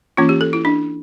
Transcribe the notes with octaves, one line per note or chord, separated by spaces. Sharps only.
E3 A#3 C#4 F4
G4
A4
E4
D4